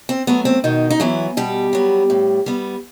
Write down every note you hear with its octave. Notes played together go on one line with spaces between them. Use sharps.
C4
F#3 A3 B3
C4
B2 D#3 D#4
D#4
E3 F#3 B3 E4
B2 G3 G4
F#3 B3
A2
G3 B3